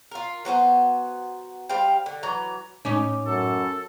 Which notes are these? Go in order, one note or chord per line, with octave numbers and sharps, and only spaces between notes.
F4 A#4
F#3 B3 C5 F#5
G3 C5 F5 G5
D3
E3 F#3 A#5
A2 C#4 D#4 D6
F#2 A4